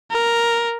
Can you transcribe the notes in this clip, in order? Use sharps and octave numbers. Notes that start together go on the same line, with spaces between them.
A#4